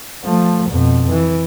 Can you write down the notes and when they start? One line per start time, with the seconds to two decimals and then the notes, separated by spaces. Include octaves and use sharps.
0.25 F3 A3
0.70 F2 B2
1.10 E3